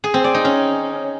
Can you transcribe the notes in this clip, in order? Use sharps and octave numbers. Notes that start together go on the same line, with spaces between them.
G#4
C4
D5
D#4
C#4